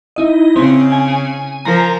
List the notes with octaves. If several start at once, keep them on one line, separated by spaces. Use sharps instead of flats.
D#4 E4 D#5
C#3 C4
G#5
F3 A#4 A#5